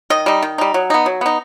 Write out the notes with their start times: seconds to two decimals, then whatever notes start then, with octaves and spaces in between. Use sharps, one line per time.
0.10 D#3 D#5
0.26 G3 D#4
0.42 D#3
0.58 G3 D#4
0.74 F#3
0.90 B3 D#4
1.06 F#3
1.21 B3 D#4